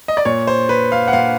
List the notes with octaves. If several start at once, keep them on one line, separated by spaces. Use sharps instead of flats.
D#5
D5
A#2 C#5
C5
B4
F5
F#5
A#2 F5